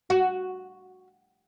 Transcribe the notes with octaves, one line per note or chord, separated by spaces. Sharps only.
F#4